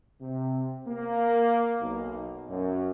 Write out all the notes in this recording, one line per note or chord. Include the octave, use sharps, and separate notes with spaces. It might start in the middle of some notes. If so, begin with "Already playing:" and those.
C3
A#3
B1
F#2